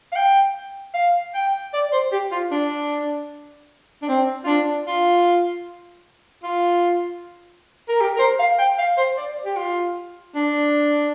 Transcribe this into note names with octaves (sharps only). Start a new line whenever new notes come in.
F5
G5
F5
G5
D5
C5
G4
F4
D4
D4
C4
F4
D4
F4
F4
A#4
G4
A#4
C5
F5
G5
F5
C5
D5
G4
F4
D4